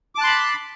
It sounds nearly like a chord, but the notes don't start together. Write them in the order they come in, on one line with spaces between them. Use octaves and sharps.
D6 A5 F#6 C6 B5